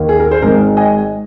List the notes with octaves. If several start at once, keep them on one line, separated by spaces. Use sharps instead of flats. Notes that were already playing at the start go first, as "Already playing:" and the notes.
Already playing: D#2 D#3 A#3
G#4
A#4
G#4 C5
G#1 G#2 G#3 C4 A#4 D#5
D#5 G#5